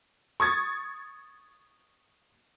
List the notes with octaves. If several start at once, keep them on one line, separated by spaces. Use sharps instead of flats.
C#6 D#6 G#6 A6